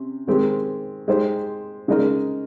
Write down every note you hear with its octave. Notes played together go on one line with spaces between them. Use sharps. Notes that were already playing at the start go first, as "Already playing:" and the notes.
Already playing: C3 C#4
D#3 G#3 C4 G4
G#3 D#4 G4 C5
C#3 G#3 D#4 A#4 D#5